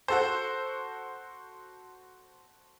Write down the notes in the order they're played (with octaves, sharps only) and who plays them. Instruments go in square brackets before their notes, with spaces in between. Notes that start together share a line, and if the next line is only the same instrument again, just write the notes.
[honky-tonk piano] F#4 A4 C5